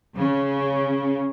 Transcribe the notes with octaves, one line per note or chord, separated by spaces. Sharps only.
C#3